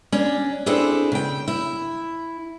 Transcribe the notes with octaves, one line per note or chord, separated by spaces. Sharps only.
C#4 D4
C4 D4 E4 G#4 A4 C5
C#3 G5
E4